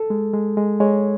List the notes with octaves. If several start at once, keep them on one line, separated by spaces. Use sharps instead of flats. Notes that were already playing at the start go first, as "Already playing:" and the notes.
Already playing: A4
G#3
G#3
G#3
G#3 C#5